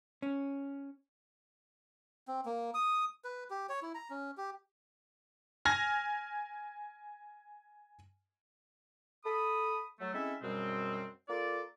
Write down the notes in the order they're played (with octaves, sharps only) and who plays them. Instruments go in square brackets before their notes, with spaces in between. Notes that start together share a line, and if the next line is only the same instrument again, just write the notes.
[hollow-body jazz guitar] C#4
[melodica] C4
A#3
D#6
B4
G4
C#5
E4
A#5
C#4
G4
[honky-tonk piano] G#5 F6 G#6 A#6
[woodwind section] A4 B5 D#6
F#3 A3
G#3 C4 C#4 E4 A4 E5
F#2 B2 G3 G#3 C4
A#3 F4 A4 D5